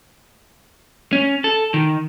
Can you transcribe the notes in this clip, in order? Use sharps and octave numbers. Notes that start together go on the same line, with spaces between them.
C#4
A4
D#3